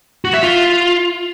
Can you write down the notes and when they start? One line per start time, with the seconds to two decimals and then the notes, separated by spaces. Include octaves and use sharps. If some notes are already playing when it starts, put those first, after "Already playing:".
0.25 F#4
0.34 E5
0.43 F4